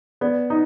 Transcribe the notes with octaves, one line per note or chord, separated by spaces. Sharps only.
B3 D5
D#4